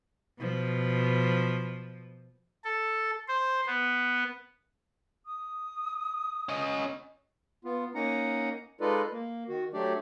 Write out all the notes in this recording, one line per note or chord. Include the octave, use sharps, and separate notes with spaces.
B2 F3
A4
C5
B3
D#6
C#4 D#5
B3 F4
A#3 C#4 D#4 F#5 A#5
G#3 D#4 F4 A4 B4 D5
A#3
D#3 F#4
F#3 A3 D4 G4 D5